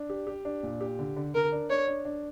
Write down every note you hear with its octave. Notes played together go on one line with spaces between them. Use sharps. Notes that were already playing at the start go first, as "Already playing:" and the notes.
Already playing: D4
G4
G4
D4
A#2
G4
D3
D3
D3 A#4
D4
D4 C#5
D4
D4